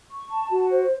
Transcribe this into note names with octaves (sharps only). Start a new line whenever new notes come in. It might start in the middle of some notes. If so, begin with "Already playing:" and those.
C#6
A5
F#4
C5